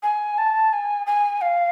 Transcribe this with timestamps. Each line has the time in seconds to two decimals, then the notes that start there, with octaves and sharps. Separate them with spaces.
0.03 G#5
0.38 A5
0.73 G#5
1.06 G#5
1.41 F5